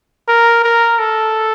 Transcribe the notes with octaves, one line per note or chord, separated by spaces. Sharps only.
A#4
A#4
A4